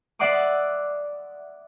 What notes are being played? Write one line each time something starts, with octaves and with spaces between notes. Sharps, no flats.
D5 E5 F#5 C6 D6 D#6